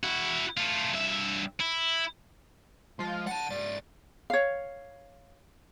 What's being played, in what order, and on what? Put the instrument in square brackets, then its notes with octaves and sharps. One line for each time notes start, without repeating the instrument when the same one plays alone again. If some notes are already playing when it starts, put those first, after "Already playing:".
[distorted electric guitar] E4 F#4
A3 F4
G2 E5
E4
[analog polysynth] F3 F4 [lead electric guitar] G#3
[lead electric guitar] F#5 A5 [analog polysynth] A6
[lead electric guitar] G#2 D5
[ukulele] C#5 F5